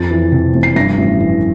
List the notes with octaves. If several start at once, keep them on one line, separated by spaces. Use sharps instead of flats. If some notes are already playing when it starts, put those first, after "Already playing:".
Already playing: F2 A6
E3
C3
F1
C7
G2 A#6
A1
E3